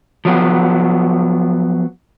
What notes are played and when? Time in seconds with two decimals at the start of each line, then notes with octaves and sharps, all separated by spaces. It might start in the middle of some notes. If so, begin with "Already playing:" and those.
0.25 F3 F#3 B3